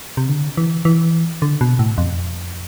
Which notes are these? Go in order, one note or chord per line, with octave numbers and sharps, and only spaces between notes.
C3
D3
E3
E3
D3
B2
A2
F2